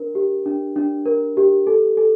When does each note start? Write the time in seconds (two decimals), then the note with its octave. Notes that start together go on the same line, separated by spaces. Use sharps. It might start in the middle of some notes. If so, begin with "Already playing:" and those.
Already playing: D4 A#4
0.15 G4
0.46 D4
0.76 D4
1.06 A#4
1.37 G4
1.67 A4
1.97 A4